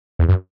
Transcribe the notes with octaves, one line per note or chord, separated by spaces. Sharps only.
E2
F#2